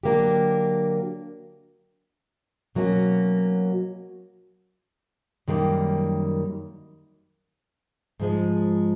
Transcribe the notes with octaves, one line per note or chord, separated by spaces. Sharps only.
D3 F#3 A#3 D4 G4
B2 F#3 A#3 C#4 F#4
F#2 D#3 G3 A#3
G#2 F3 G#3